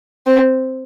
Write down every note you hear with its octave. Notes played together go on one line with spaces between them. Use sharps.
C4